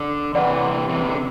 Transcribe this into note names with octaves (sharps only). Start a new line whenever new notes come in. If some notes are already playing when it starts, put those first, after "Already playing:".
Already playing: D3
C3 E3 B4 D5 F#5 B5
C3 E3
D3